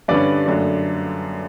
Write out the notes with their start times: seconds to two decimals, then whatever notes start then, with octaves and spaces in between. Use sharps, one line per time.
0.08 G2 D3 G3 C#4 B4 D5
0.46 F#2 D3 A3 D4